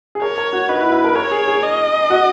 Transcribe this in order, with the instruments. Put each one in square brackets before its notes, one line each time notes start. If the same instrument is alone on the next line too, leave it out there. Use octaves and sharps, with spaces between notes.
[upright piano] G#4
[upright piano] A#4 [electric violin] C#5
[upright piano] A#4
F#4
[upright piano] D#4 [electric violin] B4
[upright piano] F#4
E4
E4
A#4
[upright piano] A#4 [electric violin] C#5
[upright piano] G#4
G#4
[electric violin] D#5
[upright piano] F#4